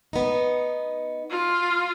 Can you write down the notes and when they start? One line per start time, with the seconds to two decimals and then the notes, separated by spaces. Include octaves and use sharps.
0.13 B3 D#4
1.31 F4